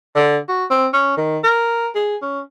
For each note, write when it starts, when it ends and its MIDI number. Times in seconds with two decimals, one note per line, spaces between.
0.16 0.37 50
0.48 0.65 66
0.70 0.87 60
0.93 1.16 61
1.17 1.39 51
1.44 1.89 70
1.95 2.16 68
2.22 2.40 61